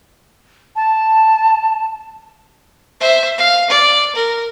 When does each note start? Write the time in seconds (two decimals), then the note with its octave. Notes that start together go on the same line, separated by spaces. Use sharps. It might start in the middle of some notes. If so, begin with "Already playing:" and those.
0.76 A5
3.01 C5 E5
3.38 F5
3.70 D5
4.16 A#4